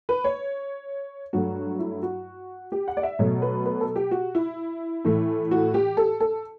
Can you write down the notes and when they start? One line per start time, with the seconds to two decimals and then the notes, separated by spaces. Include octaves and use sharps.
0.09 B4
0.24 C#5
1.33 G2 F#3 A3 F#4
1.79 E4
2.03 F#4
2.72 G4
2.88 F#5
2.97 D5
3.03 E5
3.19 B2 F#3 A3 C#5
3.42 B4
3.65 B4
3.81 A4
3.96 G4
4.11 F#4
4.35 E4
5.05 A2 E3 A3
5.51 F#4
5.74 G4
5.97 A4
6.20 A4